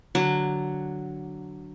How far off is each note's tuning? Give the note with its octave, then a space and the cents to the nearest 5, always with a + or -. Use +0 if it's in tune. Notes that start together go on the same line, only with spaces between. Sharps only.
D3 +0 F#3 +0 A5 +0